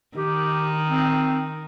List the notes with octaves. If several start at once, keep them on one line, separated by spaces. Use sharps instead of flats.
D#3 G4
C4